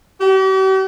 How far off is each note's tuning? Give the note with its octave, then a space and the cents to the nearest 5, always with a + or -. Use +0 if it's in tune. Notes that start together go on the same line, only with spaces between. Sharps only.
G4 -45